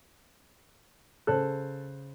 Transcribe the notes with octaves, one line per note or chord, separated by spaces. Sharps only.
C#3 A4 C5 F#6